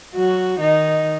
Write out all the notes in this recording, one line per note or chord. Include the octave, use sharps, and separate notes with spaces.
F#3 F#4
D#3 D#4